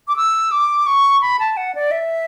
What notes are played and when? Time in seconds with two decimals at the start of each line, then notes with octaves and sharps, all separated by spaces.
0.08 D6
0.17 E6
0.51 D6
0.87 C#6
1.21 B5
1.39 A5
1.57 F#5
1.75 D5
1.91 E5